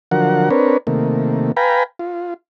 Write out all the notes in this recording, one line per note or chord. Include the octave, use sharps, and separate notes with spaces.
D3 F3 F#3 A#4 F#5
C4 D4 A#4 B4 C#5
C3 D#3 A3 A#3
B4 F5 G5 G#5 A#5 B5
F4